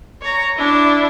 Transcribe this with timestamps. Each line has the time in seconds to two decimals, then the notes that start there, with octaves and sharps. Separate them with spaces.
0.22 C#5 A#5
0.57 D4 E4